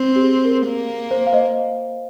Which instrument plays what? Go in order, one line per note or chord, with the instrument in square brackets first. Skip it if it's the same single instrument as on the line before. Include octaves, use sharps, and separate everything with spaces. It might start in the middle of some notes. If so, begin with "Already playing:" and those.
Already playing: [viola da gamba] C4
[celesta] G4
G#4
A#4
[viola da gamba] A#3
[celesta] C5
F5
C5 D#5